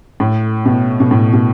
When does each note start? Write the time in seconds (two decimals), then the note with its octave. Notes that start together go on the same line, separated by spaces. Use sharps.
0.20 A2
0.66 B2
1.00 B2
1.11 A2
1.33 B2